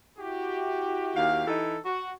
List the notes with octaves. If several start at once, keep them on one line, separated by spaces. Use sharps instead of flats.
E4 F#4 G4
D#2 F5
E3 D#4 A4
F#4